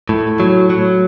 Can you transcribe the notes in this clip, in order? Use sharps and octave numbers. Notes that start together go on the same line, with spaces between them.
A2
F#3
F#3